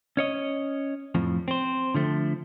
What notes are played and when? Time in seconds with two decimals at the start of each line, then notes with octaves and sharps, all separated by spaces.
0.17 C#4 C#5 D#5
1.15 F2 A2 F3
1.48 C4 C5
1.95 D3 F3 A3